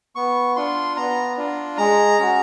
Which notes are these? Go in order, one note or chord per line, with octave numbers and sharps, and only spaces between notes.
B3 C#6
D4 F4 C6
B3 A#5
D4 F4
G#3 A#5
C#4 F#4